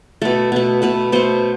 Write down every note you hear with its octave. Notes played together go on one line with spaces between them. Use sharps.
B2 A3 A4
B2 A3
B2 A3 B4
B2 A3 C5